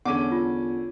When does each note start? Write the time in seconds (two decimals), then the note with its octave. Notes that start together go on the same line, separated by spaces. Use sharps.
0.05 E2 D3 C#4 F#5 D6 D#7
0.32 F4